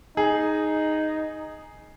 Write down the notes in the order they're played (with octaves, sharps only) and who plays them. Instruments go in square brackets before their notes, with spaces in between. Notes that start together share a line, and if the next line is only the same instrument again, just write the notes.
[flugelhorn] D#4 [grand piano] G#4